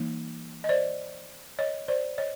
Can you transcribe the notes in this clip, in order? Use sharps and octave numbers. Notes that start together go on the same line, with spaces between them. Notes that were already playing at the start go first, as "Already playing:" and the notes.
Already playing: E3 G3 A#3 D#4
D#5
C5 D5
C#5 D#5
C5 D5
C#5 D#5